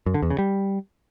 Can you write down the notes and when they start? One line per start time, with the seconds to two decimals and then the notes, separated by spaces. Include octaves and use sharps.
0.06 F#2
0.14 D3
0.22 E2
0.30 C#3
0.38 G3